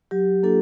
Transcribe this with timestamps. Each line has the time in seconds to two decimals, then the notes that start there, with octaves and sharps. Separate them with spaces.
0.11 F#3 G4
0.43 A#3 D4 F4 A4